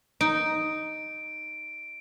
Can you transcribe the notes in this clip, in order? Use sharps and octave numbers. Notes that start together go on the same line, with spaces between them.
D#4 D7